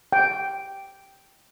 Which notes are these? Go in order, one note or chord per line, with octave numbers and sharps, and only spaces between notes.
G5